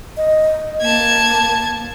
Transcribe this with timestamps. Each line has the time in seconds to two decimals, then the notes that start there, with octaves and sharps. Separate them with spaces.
0.17 D#5
0.81 A#3 A5 G#6